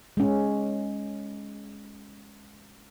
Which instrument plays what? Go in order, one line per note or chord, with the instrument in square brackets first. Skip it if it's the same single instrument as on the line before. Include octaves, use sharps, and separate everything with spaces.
[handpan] G#3 C#4